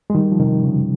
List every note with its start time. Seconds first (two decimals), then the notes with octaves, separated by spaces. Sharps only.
0.10 G#3
0.15 D#3 G3
0.32 F3
0.39 C3 D#3
0.63 C#3